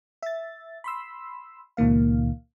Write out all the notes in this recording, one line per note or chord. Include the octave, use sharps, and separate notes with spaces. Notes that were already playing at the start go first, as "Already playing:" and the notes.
E5 A6
B5 C6 E6
C#2 A#2 D#3 A#3 F5